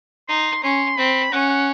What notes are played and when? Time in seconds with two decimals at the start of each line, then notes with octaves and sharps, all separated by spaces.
0.28 D#4 C6
0.63 C#4 C6
0.98 C4 B5
1.32 C#4 F#5
1.50 F#5